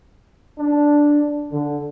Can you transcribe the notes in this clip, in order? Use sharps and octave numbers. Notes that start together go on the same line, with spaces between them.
D4
D3